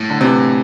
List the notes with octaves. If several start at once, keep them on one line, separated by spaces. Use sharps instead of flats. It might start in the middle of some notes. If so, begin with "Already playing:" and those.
Already playing: A2
D3
C3 E3